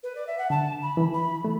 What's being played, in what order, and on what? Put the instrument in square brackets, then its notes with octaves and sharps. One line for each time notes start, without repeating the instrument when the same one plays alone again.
[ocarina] B4
D5
E5
F#5
[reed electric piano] D3 [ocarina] A5
[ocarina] B5
[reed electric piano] E3
[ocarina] B5
[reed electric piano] A3